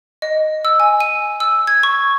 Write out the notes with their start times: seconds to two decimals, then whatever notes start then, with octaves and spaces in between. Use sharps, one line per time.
0.22 D#5
0.65 E6
0.80 G#5
1.00 D#7
1.40 E6
1.67 G#6
1.83 C#6